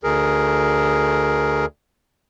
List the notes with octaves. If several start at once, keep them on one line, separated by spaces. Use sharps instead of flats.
D2 G#4 A#4